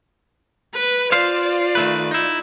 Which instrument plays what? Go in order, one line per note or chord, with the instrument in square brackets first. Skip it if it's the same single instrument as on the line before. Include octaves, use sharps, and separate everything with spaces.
[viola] B4
[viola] F4 D5 [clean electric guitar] C5 F5
[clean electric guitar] D#3 A3 B4
D#4 E4